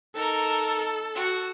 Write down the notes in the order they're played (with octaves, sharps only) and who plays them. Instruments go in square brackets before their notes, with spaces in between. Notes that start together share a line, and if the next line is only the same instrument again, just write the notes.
[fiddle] D#4 A#4 [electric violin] A4
[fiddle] F#4